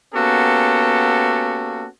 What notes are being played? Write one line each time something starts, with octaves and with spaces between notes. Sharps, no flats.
A#3 B3 C#4 F#4 G4 A4